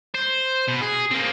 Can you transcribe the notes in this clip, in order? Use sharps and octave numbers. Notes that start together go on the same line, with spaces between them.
C5
B2
G#4
A#3 C4